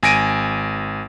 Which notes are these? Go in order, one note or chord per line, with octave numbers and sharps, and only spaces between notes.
G#1 G#5 A#6 D7 D#7